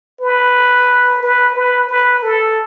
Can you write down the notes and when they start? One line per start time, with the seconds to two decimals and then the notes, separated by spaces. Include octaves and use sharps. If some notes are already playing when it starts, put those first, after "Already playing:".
0.21 B4
1.23 B4
1.56 B4
1.89 B4
2.23 A4